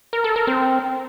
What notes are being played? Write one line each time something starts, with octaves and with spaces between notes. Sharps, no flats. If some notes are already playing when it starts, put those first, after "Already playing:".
A#4
A4
A#4
C4